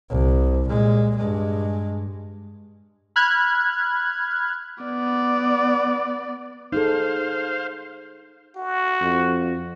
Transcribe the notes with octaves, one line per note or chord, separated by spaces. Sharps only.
C2
A#2 G#3
G2 G#3
B5 F6 F#6 G#6
B3 D5
D#4 G#4 A4 C5 F5
F#4
F2